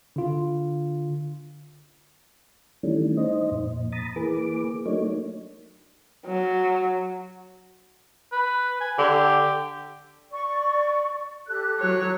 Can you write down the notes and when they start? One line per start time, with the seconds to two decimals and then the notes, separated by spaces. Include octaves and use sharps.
0.16 D3 F4
2.83 D#3 E3 G3 A3 C#4 D4
3.17 D#4 C5 D#5
3.51 F2 A#2
3.92 A#5 B5 D#6 A6
4.16 E3 A#3 G#4 B4 D6
4.86 F#3 A3 A#3 D4 D#4 C#5
6.26 F#3
8.32 B4
8.81 G#5
8.99 D3 G4
10.31 D5 C#6
11.47 G4 A4 F#6
11.80 F#3 C#5